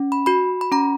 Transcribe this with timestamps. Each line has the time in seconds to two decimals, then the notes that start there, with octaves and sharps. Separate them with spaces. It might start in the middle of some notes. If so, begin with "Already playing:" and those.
Already playing: C#4
0.12 B5
0.26 F#4 B5
0.61 B5
0.72 C#4 A#5